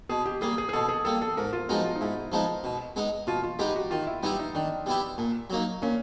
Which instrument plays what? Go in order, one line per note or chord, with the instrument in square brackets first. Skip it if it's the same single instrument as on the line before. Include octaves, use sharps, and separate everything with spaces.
[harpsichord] B2 [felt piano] G#4
[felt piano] G4
[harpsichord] G3 A#3 [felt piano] G#4
[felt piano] G#4
G#4
[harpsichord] B2 [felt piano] A4
[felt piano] G#4
[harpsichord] G3 A#3 [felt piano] A4
[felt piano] A4
[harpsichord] G#2 [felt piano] A#4
[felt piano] F4
[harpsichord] F3 G#3 B3 D#4 [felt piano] F#4
[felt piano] F4
D#4
[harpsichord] G#2 [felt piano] E4
[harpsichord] F3 G#3 B3 D#4
B2
G#3 B3 D#4
[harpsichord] B2 [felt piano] F4
[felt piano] F4
[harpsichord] G#3 B3 D#4 [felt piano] G4
[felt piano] F#4
[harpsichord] D#3 [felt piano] F4
[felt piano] E4
[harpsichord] G3 B3 E4 G4 [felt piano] D#4
[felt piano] D#4
[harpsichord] D#3 [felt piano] D4
[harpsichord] G3 B3 E4 G4
A#2
F#3 A#3 D#4
[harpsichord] A#2 [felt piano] C#4